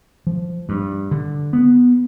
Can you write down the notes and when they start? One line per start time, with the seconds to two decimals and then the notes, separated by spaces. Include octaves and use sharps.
0.27 F3
0.69 G2
1.11 D3
1.53 B3